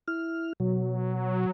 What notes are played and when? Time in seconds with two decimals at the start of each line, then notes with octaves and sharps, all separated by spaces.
0.08 E4 F6
0.60 B2 F#3